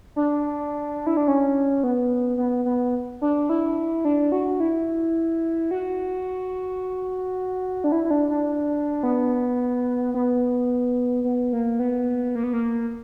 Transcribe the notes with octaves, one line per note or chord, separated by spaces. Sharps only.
D4
E4
D4
C#4
B3
B3
B3
D4
E4
D4
F#4
E4
F#4
D4
E4
E4
D4
D4
B3
B3
B3
A#3
B3
A#3
B3
A#3